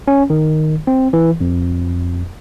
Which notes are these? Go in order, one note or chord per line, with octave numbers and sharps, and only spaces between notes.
C#4
D#3
C4
E3
F2